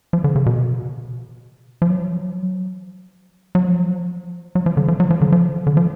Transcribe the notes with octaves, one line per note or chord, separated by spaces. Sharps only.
F3
D3
C#3
B2
F3
F#3
F#3
F3
F#3
F3
D3
F3
F#3
F3
D3
F3
D3
F3